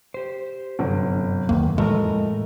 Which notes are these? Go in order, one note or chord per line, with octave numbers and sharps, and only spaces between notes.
G4 C5
G1 F#2 C3
D1 E2 D#3 A#3
F2 A2 E3 G#3 A3 A#4 D#5